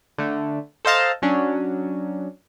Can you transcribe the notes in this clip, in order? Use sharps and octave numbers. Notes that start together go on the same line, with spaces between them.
D3 A3
A4 C5 D#5 F5 A5 A#5
F#3 C#4 D4